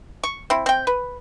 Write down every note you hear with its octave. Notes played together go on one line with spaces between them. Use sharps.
C#6
C4 E4
C4 G5
B4